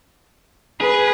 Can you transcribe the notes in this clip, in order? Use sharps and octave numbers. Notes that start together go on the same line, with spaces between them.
G#4 B4